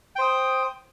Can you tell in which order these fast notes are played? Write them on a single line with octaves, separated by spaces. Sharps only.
G5 C5 D#6